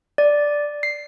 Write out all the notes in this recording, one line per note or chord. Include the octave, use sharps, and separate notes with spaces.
D5
C7